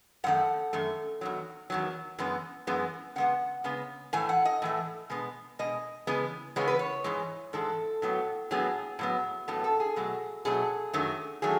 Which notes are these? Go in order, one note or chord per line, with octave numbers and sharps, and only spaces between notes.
F#2 D#3 A3 F#5
F#2 D#3 A3
E2 D#3 F#3
E2 D#3 F#3
F#2 E3 G#3 B3
F#2 E3 G#3 B3
C#3 G#3 B3 F#5
C#3 G#3 B3
A2 E3 A3 G#5
F#5
D#5
A2 E3 A3
B2 G#3 B3
B2 G#3 D#5
C#3 E3 G#3 B3
C#3 E3 G#3 B3 C#5
B4
C#5
G#2 E3 G#3
G#2 E3 G#3 A4
A2 F#3 B3
A2 F#3 B3 G#4
A2 F#3 B3
A2 F#3 B3 A4
A4
G#4
B2 F#3 A3
B2 F#3 A3 G#4
F#2 D#3 F#3 A3
D#3 F#3 A3 G#4